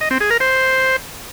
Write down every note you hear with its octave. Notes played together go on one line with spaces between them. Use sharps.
D#5
C4
G#4
A#4
C5